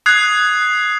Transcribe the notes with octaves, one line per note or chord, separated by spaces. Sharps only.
D#6 F#6 G#6 C7